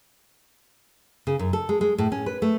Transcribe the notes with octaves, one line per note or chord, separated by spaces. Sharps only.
C#3
F#2
A4
G#3
G#3
A2
C#4
B4
A3